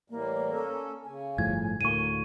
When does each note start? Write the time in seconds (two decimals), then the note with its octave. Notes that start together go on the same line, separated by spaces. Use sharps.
0.10 A2 E3 G3 A#3
0.52 C#4 A4
1.05 C#3 G#5
1.38 G1 A2 F3 G#6
1.81 D2 A2 A#3 C#6 D#7